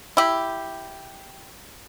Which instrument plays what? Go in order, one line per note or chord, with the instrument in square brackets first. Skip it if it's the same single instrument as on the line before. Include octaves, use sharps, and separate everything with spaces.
[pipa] E4 G4